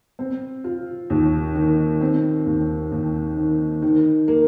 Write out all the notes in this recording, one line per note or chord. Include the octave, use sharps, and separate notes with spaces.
C4
F4
D#2
D#3
C4
D#2
D#2
D#3
D#3
A#3